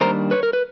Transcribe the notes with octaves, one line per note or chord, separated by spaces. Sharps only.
D#3 G3 A#3 D4 A#4 C5
B4 C#5
A#4
B4